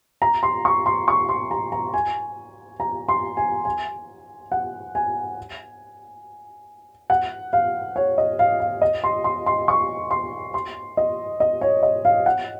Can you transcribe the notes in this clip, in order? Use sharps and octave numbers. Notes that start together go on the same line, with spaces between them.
A#5
C6
C#6
C6
C#6
C6
A#5
A#5
G#5
A#5
C6
G#5
G#5
F#5
G#5
F#5
F5
C#5
D#5
F5
F5
D#5
C6
C6
C6
C#6
C6
C6
D#5
D#5
C#5
D#5
F5
F#5